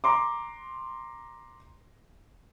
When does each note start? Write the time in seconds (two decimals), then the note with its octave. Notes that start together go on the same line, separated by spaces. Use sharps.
0.04 A#5 C6 D6